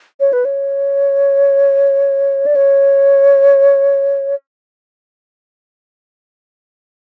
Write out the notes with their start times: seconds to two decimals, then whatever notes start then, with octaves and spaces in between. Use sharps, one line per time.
0.20 C#5
0.33 B4
0.45 C#5
2.46 D5
2.55 C#5